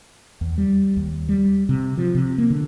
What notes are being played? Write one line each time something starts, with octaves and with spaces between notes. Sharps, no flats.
E2
G3
D#2
G3
C3
F3
C3
A#3
D3